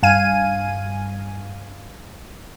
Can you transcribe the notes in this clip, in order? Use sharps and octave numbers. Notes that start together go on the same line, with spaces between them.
G2 F5 G#5 D#7